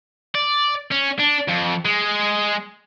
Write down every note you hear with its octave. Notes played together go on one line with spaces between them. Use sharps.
D5
C#4
D4
F2
G#3